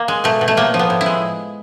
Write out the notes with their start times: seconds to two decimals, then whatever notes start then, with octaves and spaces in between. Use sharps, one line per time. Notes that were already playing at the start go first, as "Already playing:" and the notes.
Already playing: A#3
0.08 G#3
0.24 B2 A3
0.41 B2
0.48 A3
0.57 A2 A#3
0.74 F3
0.79 B3
0.90 A2
1.01 E4
1.06 G#3